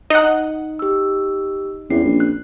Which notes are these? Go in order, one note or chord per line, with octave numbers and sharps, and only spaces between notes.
D#4 D#5 F#5
G4 E6
E2 C4 C#4 C7
A#1
F#6